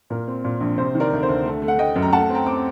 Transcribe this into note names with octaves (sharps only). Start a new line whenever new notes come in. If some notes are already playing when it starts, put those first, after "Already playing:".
A#2 A#4
C4
A#2
A#1
C3 C5
D#3
A#4 D5
D2 D5
C5
D2
A3
A3
F#5
A3 D#5 G5
F#2
A#5
A3 F#5 A5
C4
G5 A#5
C4 D6